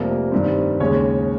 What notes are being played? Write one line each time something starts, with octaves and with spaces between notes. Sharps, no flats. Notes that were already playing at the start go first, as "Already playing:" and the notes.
Already playing: F1 F2 C3 G3 A#3
G2 D#3 G3 C4
D#2 C#3 G#3 C#4 C#5